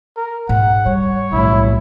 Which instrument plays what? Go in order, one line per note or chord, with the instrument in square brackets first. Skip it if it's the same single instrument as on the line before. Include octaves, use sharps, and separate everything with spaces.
[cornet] A#4
[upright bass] G#2 [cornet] F#5
[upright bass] G3 [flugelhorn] C#5
[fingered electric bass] B1 A2 [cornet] E4